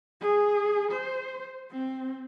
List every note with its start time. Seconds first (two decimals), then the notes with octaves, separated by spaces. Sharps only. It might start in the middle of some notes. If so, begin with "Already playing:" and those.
0.20 G#4
0.92 C5
1.71 C4